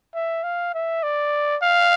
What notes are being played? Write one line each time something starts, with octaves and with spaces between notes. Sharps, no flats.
E5
F5
E5
D5
F5